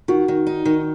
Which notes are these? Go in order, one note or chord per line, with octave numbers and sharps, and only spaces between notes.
D#3 F#4
D#3
D#4
D#3